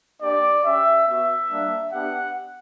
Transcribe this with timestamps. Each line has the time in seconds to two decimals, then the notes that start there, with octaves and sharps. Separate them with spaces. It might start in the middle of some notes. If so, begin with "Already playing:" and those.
0.22 A#3 D4 G4 D5
0.64 C#4 G4 E5
1.07 B3 F#4 E5
1.50 G3 A#3 D4
1.92 B3 D4 G4 F#5